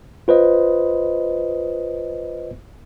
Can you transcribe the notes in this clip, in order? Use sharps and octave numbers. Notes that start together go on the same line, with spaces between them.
F4 B4 C5 D#5